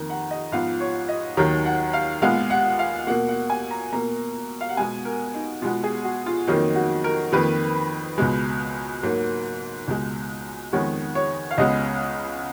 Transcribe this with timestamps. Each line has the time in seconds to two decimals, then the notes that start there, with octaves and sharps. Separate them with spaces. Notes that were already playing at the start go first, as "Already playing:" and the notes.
Already playing: F2 D#3 A#3 A#5
0.10 F#5
0.31 D#5
0.52 G#2 F3 B3 F5
0.80 C#5
1.09 D#5
1.37 D#2 D#3 F#3 A#5
1.65 F#5
1.93 F5
2.22 A#2 G#3 B3 F5
2.50 F#5
2.79 F5
3.07 B2 A#3 F#5
3.28 F#5
3.50 G#5
3.71 A#5
3.93 B2 A#3 A#5
4.61 F5
4.69 F#5
4.77 B2 G#3 B3 G#5
5.05 A#4
5.34 D#4
5.62 B2 G#3 B3 F4
5.84 G#4
6.05 F#4
6.26 F4
6.48 F2 D#3 F#3 A#3 D#4
6.76 F#4
7.04 A#4
7.32 F2 D#3 A#3 B4
8.18 C#2 B2 G#3
9.03 G#2 F#3 A#3
9.88 C#2 B2 G#3
10.73 F2 D#3 G#3 B3 C#5
11.15 C#5
11.51 F5
11.58 C#2 C#3 G#3 B3 D#5